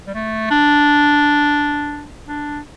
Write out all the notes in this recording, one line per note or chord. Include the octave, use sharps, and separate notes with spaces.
G3
A3
D4
D4